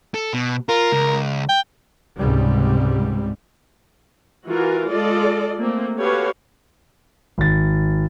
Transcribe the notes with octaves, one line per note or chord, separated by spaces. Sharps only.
A4
B2
F4 A#4
C#2
G5
C#2 G#2 C3 G3
E3 F4 F#4 A#4
G#3 F4 A4 D5 D#5
A3 A#3 C4
F#4 G4 A4 B4 C#5 F5
G#1 A6